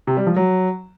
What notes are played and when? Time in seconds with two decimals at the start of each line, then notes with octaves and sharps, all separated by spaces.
0.07 C3
0.17 G3
0.27 F3
0.36 F#3